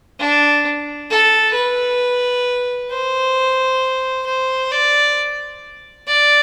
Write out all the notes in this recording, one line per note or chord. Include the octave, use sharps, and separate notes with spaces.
D4
A4
B4
C5
C5
D5
D5